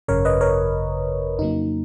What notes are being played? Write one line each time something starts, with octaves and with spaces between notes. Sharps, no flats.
G#1 F#2 C#3 A#4 C#5
B4 D#5
A#4 C#5
F2 C#3 F#3 A#3 D#4